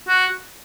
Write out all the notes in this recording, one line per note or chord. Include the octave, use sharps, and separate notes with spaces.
F#4